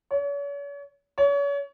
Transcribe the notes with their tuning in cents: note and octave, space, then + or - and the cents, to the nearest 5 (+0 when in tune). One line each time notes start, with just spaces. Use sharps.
C#5 +40
C#5 +35